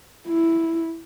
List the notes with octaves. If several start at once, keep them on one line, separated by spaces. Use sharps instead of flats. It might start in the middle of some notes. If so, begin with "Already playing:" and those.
E4